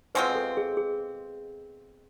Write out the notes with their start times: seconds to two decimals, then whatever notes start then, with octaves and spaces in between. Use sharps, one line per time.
0.15 B2 G#3 C4 F4 B4
0.35 A4
0.57 G#4
0.77 G#4